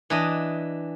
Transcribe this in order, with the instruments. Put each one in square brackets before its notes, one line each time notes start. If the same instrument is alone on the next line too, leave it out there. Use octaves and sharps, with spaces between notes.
[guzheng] E3 D4 D#5